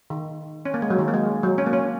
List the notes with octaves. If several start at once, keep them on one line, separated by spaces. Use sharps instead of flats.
D#3
C#4
A#3
G#3
F#3
D#3
A#3
G#3
F#3
C#4
A#3
C#4